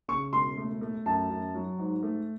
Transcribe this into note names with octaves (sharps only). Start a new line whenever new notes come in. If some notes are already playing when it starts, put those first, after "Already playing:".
C#3 C#6
E1 C6
A3
A3
F#2 A5
F#2
F#3
G#2
A3